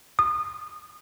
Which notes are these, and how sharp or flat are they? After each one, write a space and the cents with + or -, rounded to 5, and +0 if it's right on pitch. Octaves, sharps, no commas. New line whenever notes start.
D#6 -30